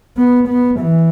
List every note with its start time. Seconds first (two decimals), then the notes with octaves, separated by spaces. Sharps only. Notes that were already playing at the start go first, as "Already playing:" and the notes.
0.17 B3
0.48 B3
0.80 E3